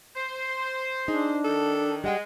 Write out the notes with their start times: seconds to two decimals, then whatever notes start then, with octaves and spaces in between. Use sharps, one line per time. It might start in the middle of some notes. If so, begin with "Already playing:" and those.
0.15 C5
1.08 D4 D#4 G#4
1.44 D#3 A4
2.04 G3 G#3 F#5 G5